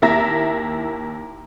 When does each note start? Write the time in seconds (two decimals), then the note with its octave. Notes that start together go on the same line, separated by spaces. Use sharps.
0.02 D#2 A#3 E4 E5 A#5 A#6